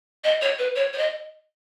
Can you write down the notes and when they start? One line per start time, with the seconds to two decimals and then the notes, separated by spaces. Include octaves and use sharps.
0.24 D#5
0.41 C#5
0.58 B4
0.75 C#5
0.93 C#5
0.97 D#5